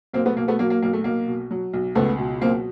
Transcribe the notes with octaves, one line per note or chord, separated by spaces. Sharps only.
B1 A#3 C4
A3 B3
B2 A#3
A3 B3
F#3 A#3
A#3
B1 A#3
A3
B1 A#3
B2
F#3
B1
C#2 A3 B3
B2
F#3 A#3 C4